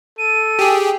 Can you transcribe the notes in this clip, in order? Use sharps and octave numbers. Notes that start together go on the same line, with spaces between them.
A4 D#7
G4 G#4